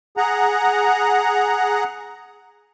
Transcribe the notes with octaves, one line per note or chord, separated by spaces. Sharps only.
G#4 F#5 A#5